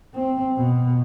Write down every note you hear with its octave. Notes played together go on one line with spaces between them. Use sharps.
C4
B2